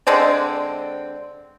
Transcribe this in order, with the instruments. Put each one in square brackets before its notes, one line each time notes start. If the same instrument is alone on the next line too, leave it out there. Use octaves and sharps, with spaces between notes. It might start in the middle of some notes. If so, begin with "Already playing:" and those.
[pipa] D3 G#3 C4 D5